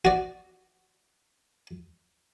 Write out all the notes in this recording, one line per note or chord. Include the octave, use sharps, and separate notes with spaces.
F#4 D5